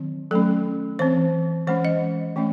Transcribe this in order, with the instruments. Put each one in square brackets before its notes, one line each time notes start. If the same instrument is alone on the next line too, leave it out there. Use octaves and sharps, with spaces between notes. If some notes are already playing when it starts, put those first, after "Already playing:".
Already playing: [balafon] D#3 F#3 C4
F#3 A3 C#4 A4
E3 C4 C5
E3 G#3 C#4 C5
D#5
E3 A3 C#4